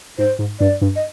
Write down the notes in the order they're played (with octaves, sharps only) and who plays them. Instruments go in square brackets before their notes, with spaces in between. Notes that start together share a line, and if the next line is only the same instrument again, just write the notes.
[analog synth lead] G#2 [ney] C5
[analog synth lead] G#2
[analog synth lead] G2 [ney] D5
[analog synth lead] G2
[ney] D#5